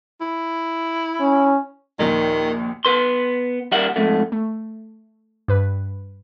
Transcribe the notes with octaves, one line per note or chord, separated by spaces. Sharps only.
E4
C#4
A#1 D#2 A#2 D#3
B3 B4 C6
D#2 G3 G4 A#4 E5 F#5
F2 G#2 A3
A3
G2 B4